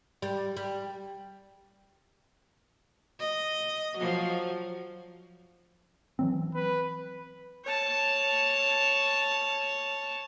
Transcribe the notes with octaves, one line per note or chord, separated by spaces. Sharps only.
G3
G3
D#5
F3 F#3
E3 F#3 C4
B4
C#5 A5